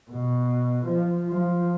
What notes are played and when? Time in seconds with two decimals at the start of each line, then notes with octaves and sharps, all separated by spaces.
0.11 B2
0.86 F3
1.29 F3